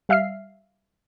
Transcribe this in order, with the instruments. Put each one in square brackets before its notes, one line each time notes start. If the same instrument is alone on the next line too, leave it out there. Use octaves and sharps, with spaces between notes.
[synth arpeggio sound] G3 E5 F5 F6 C7